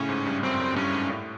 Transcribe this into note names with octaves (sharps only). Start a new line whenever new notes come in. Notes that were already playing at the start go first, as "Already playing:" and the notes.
Already playing: A2 C#3 C#4
G#2
G2
F#2 C4
F#2
G2 C#4
G#2
A2